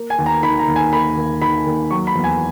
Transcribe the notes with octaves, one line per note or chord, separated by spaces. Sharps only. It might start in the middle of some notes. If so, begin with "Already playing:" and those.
Already playing: A#3
G#5
D#2
A#5
D#3 B5
A#5
D#2
G#5
A#3 B5
D#2
D#3 B5
D#2
F#3 C#6
B5
E2
G#5